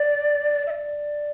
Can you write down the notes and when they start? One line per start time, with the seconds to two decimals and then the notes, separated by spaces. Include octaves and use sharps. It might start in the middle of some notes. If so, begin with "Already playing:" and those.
Already playing: D5
0.67 E5
0.71 D5